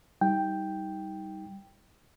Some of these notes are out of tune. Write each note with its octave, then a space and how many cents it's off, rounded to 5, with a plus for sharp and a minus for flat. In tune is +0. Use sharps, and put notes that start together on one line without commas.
G3 -5 D#4 +25 G5 +0